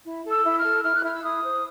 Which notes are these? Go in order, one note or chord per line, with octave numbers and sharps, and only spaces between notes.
E4
A4
E6
E4
F6
A4
E4 F6
F#6
E4 F6
E6
E4 D#6
C5